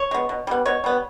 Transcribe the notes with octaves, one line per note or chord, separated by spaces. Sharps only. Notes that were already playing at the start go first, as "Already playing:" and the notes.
Already playing: C#5
G#3 B3
B2
G3 B3
B2 C#5
G3 B3